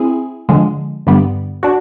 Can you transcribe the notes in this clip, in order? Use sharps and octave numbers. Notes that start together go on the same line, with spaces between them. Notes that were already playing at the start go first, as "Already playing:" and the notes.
Already playing: C4 E4 G#4
D3 F3 G#3
G2 D3 G3 B3
D4 F#4